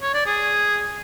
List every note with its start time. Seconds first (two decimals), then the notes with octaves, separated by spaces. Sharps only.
0.02 C#5
0.14 D5
0.26 G#4